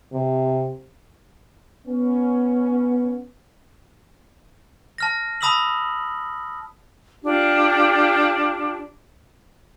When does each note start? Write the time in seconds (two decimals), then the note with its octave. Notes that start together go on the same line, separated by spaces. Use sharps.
0.13 C3
1.86 B3 C#4
4.98 A5 F6 A#6
5.41 A5 B5 D#6 E6 B6 F#7
7.23 D4 F4 G4